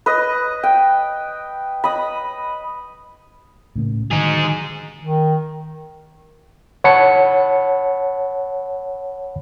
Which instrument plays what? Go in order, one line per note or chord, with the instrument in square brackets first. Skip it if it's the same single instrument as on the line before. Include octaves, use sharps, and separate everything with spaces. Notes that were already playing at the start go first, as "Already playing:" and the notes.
[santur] B4 D#5
G5
D#5 B5
[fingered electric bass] A2 C#3 A#3
[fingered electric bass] D3 D#3 F#3 [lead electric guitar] D#4 G#4
[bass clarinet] D#3
[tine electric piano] C#5 F#5 A5 B5 C#7